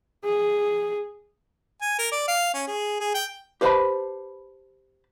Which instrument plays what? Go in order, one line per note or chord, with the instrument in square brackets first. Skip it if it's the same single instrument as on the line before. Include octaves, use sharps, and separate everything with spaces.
[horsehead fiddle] G#4
[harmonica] G#5
A#4
D5
F5
C#4
G#4
G#4
G5
[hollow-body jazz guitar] G4 B4 C5 F5 A5 B5